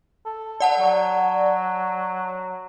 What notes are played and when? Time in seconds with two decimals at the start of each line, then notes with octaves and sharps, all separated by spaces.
0.26 A4
0.60 D5 F#5 A5
0.79 F#3